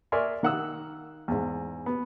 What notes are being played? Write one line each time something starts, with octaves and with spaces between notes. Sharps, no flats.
A#4 D5 E5 G#5 C6 C#6
D#3 A#3 F#5 D#6 E6
E2 G#2
B3